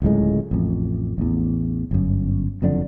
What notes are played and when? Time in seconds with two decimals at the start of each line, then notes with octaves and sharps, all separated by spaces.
0.02 D1 C#2 A2 G#3
0.51 A1 F2
1.18 A1 E2
1.91 G1 F#2
2.62 F#1 F2 D3 D4